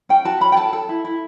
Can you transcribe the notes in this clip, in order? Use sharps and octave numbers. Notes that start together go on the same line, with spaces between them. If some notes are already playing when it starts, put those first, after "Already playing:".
C#4 G5
F#4 A5
C#4 B5
G5
A4 A5
A4
E4
E4